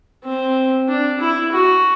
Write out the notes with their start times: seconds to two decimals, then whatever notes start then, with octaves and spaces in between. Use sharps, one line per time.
0.24 C4
0.89 D4
1.20 E4
1.52 F#4